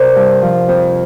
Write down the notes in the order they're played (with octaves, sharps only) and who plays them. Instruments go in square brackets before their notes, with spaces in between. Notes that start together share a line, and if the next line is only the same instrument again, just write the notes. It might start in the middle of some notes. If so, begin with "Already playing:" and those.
Already playing: [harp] C3 A#4 C5 D5
G2
F3
F2